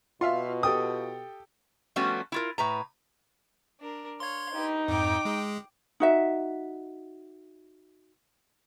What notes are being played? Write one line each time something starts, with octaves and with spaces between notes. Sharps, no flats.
B2 F4 E5 F5 C6
G4 A4 G5 D#6
F3 G3 A3 B3 C#4 F#4
E4 F4 A#4
A2 B4 A#5
D4 A#4
C#5 F5 C6 G#6
D#4 G4 B4
F2 G#2 G5 D6
G#3 G#4
D#4 F#4 E5